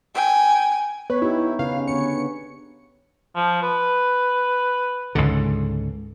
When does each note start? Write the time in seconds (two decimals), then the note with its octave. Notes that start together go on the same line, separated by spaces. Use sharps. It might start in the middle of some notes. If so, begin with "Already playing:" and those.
0.15 G5 G#5
1.10 B3 B4 C#5
1.22 D#4 E4 G4
1.59 C#3 C#4 B4 F5
1.88 D3 B3 C#5 C#7
3.36 F3
3.62 B4
5.15 C#2 G#2 D3